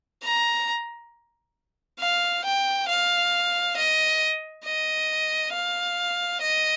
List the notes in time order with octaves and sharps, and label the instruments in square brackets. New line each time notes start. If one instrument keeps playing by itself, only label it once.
[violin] A#5
F5
G5
F5
D#5
D#5
F5
D#5